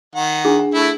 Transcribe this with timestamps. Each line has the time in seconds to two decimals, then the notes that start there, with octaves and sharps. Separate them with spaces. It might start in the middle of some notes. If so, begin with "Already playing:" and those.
0.15 D#3 F#5
0.45 D4 G#4
0.59 F#5
0.74 A3 E4